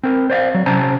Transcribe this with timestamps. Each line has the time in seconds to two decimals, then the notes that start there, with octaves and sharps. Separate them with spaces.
0.04 C4 A#4
0.30 C5 D5 E5 F5
0.54 F#3
0.66 C3 C#4 C5 A5 A#5